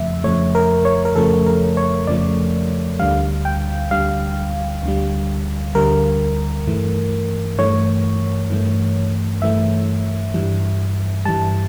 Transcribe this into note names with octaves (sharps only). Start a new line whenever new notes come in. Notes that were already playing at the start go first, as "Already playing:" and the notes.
Already playing: F2 C#3 F3 A3 E5
F2 C#3 F3 A3 C#5
A#4
C#5
A#4
F2 C#3 F3 A3 A4
A#4
C#5
F2 C#3 F3 A3 D5
D2 D3 G3 F5
G5
D2 D3 G3 F5
D2 D3 G3
D2 D3 G3 A#4
G2 E3 A3
G2 E3 A3 C#5
G2 E3 A3
G2 E3 A3 E5
G2 E3 G3
G2 E3 G3 A5